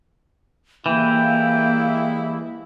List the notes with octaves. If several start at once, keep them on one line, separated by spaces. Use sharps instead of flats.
E3 G3 G#3 A#3 E4 G5